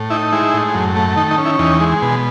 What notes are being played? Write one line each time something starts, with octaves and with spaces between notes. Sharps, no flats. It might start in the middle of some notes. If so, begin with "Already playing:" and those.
Already playing: A2
D#4 E4
G#3 E4
A2
F#2
A3
D#3 D#4
D#4
C#4
E4
E2 D#4
G#3
B2